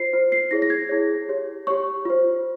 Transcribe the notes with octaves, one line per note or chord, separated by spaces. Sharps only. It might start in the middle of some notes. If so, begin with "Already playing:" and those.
Already playing: F4 C5 C7
F4 C5
C7
E4 G#4 C#5 A#6
A#6
G#6
E4 G#4 C#5
G4 C#5
G4 C#5 C#6
F4 C5